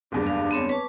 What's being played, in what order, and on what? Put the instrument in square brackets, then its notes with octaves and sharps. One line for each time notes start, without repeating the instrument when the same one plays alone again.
[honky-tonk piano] F#1 E2 G2 [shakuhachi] D4
[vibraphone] F5
B3 C4 C#5
[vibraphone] B4 A5 D6 [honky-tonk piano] C#5